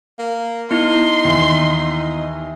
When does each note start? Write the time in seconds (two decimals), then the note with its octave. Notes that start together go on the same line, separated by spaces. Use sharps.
0.19 A#3
0.71 B3 D#4 E4 C6
1.25 D#2 E3